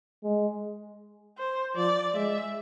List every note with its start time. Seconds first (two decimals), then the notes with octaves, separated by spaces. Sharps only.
0.24 G#3
1.38 C5
1.75 F3 D5
2.14 G#3 E5